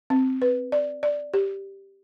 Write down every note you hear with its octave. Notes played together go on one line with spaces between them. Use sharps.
C4
B4
D5
D5
G4